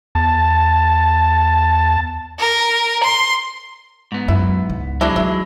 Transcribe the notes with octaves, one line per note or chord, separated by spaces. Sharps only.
E2 A5
A#4
C6
G#2 B3
F#2 E4
C#2
F#3 G#3 D4 E4
E3 D#4 E4